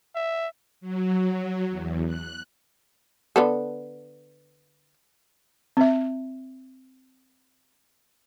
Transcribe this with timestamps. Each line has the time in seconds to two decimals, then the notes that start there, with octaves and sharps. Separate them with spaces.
0.15 E5
0.81 F#3
1.32 F#3
1.71 E2
2.06 F#6
3.36 D3 B3 A4
5.77 C4 E5